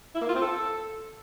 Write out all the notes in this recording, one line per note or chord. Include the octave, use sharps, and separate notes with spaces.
E4
A#3
F4
C4
A4